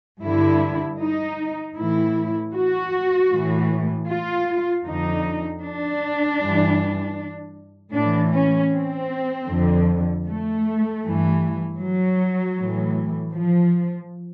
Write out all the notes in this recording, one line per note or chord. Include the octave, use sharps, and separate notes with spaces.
G2 D3 E4
D#4
A2 E3 E4
F#4
A2 E3
F4
F2 D3 D#4
D4
G2 E3
A2 D4
E3
C#4
C4
F2 D3
A3
G2 E3
F#3
A2 E3
F3